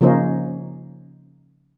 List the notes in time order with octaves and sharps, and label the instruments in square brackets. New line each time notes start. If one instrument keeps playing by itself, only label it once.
[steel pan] C#3 F3 A#3 C#4 D#4 C5